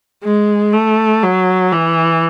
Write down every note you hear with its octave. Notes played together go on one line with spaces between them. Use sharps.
G#3
A3
F#3
E3